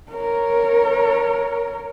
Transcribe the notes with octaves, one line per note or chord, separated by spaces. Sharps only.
A#4 C#5